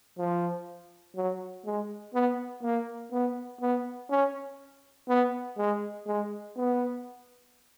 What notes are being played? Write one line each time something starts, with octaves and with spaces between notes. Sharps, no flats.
F3
F#3
G#3
B3
A#3
B3
B3
C#4
B3
G#3
G#3
B3